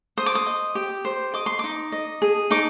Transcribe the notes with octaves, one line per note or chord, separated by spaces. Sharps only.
C5 D#6
D6
D#6
D#5
G4
C5
D#5 D6
C6
D#4 D6
D#5
G#4
D#4 D6